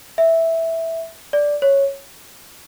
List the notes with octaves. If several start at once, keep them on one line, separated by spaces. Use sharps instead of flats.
E5
D5
C#5